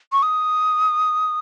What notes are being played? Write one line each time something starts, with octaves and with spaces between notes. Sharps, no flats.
C#6
D#6